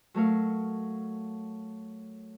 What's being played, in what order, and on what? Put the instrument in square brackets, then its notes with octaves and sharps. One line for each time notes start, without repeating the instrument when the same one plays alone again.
[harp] F#3 A3 A#4 F5